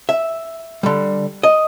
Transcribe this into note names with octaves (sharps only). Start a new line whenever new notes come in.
E5
D3 G3
D#5